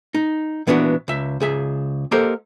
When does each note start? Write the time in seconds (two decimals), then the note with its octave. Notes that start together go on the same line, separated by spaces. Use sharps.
0.14 D#4
0.67 A#2 E3 B3 D4 F4 F#4
1.08 C#2 E5
1.40 C#2 G#4 E5
2.11 A#3 G4 A4 A#4 C5 D#5